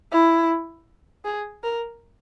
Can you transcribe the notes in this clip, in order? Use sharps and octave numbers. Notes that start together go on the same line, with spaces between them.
E4
G#4
A#4